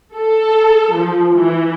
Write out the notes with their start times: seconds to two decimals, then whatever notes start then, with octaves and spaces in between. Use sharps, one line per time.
0.15 A4
0.96 F3
1.34 E3